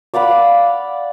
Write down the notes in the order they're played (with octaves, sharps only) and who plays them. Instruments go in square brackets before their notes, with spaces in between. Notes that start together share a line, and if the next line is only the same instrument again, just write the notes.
[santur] D5 F5 F#5 B5